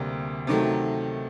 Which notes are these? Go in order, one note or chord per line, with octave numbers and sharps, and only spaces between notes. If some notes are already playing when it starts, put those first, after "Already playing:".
Already playing: D2 C3 G3 A#3
C3 D#3 F#3 A3